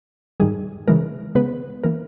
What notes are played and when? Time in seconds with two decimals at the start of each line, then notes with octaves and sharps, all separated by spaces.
0.40 G#2 D#3 G3 G#4
0.88 C#3 E3 G#3 A#4
1.35 C#3 G#3 B3 B4
1.84 E3 A#3 A#4